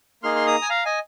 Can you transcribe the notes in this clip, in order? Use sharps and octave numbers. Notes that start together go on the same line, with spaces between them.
A#3 D#4 G#4 C6 F6
C6
A#5 D#6
G#5
F5 A#5
D#5 G#5